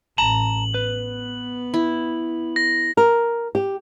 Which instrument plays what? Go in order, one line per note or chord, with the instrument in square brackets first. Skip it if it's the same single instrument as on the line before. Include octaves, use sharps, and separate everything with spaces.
[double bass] A1 [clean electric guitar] A5 A#5 [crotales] F#7
[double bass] B3 [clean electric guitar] B4
[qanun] E4
[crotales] A#6
[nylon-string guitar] A#4
G4